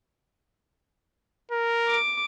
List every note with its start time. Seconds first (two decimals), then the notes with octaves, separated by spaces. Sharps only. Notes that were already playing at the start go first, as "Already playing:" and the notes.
1.51 A#4
1.89 D6